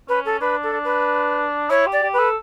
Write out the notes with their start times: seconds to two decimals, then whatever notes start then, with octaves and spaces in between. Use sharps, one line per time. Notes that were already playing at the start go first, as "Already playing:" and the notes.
0.09 C#4 B4
0.26 A4
0.41 D4 B4
0.63 A4
0.73 D4
0.84 B4
1.70 E4 C#5
1.87 G4
1.93 D5
2.03 G4
2.13 B4
2.19 A4